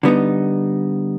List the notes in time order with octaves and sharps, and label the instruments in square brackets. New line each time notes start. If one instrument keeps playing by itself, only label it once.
[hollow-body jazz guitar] D3 G3 B3 D#4